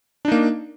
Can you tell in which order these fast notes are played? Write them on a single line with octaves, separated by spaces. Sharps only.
D4 D#4 A#3